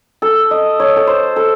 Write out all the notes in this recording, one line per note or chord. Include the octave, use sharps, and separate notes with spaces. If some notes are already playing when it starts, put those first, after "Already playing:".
A4
D#5
C#5
A4
C5
A4